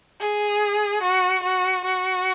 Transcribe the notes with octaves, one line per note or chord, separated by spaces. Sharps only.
G#4
F#4
F#4
F#4